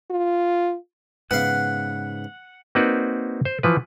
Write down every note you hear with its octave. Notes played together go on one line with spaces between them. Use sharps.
F4
G#2 C#3 B3 F5 F#5
A#3 C4 D#4 F#4 B4 D5
C5
E3 F3 B4